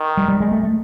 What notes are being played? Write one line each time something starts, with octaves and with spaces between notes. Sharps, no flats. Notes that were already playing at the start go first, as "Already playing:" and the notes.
Already playing: D#3
G3
G3
G#3
A3
A3